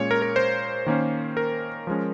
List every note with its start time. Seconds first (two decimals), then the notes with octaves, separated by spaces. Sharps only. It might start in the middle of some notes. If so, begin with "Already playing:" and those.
Already playing: A#2 G#3 C#4 C#5
0.11 A#4
0.22 A#4
0.36 C5
0.86 D#3 A#3 C#4
1.37 A#4
1.87 F3 G#3 C#4